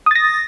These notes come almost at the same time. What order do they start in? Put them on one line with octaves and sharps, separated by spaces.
D#6 A6 A#6